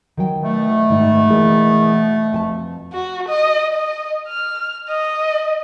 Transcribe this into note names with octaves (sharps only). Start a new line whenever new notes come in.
D#3 F#3 G5
B2 A3
G#2 D#3 D#4
E3 A#3 G#4
F2 G#5 A5
F#4
D#5
D#5
F6
D#5